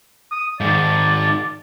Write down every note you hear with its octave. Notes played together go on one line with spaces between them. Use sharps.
D#6
G#2 D#3 D5